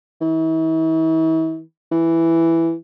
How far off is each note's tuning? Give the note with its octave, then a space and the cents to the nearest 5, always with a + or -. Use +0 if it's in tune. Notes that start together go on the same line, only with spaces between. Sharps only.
E3 -40
E3 +5